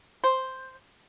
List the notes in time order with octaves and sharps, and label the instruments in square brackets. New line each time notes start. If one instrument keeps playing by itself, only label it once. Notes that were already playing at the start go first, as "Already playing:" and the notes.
[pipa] C5